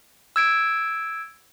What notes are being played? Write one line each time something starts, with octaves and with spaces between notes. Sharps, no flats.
E6 G#6 D7